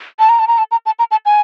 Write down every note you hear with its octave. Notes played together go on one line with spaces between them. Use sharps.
A5
A#5
A5
A#5
A5
A#5
A5
A#5
A5
G#5